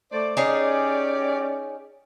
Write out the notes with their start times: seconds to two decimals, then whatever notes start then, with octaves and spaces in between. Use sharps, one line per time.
0.12 A3 C5 D5
0.37 C#4 D#4 G4 G#4 C#5 D5